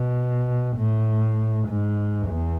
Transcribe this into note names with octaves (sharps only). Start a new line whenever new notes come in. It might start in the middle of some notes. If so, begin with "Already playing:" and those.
Already playing: B2
A2
G#2
E2